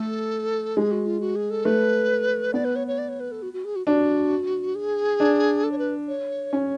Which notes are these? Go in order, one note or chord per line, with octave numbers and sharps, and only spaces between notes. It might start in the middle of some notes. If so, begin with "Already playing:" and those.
Already playing: A3 A4
G#3 G#4
F#4
F4
F#4
G#4
A4
A3 B4
B3 D5
B4
C#5
C#5
D5
C#5
B4
A4
F#4
F#4
G#4
F#4
D4 F#4
G#4
D4
A4
C#5
B4
C#5
C#4